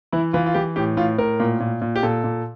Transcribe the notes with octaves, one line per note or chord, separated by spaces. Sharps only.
E3 E4
E3 F4
F4
E3 G4
A2 G4
A2 F4
A2 A#4
A#2
A#2
A#2
G4
A#2 A4
A#2